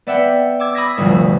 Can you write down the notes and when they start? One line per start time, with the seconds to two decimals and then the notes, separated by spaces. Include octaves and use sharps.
0.07 B3 D5 E5 F#5 G5
0.60 D6 E6 G#6
0.74 B5 D#6 E6 G#6 A#6 B6
0.97 G1 D2 C3 F3